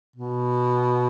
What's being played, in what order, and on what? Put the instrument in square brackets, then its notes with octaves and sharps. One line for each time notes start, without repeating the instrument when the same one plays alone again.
[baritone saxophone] B2